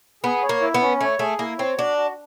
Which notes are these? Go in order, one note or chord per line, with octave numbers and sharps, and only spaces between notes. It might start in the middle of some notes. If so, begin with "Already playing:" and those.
B3 G#4
C#5
A#3
E4
B3
C#4
A3 C#5
A3 G#4
A#3 E4
C4 C#5
D4 F#4
F#4